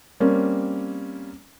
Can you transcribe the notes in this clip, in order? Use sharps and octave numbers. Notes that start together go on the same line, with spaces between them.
G3 A#3 C4 C#4